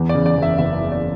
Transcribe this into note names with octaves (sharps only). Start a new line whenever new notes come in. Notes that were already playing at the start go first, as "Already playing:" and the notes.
Already playing: E2
D5
C#3
D5
F#1
E5
F#1 E5
E2
D5